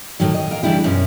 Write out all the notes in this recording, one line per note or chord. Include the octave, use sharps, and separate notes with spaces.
A2 D#3 F#3
D#5
A#4 F5
C#3 E3 G3 D4 E4 G4
F#2 B2 C#4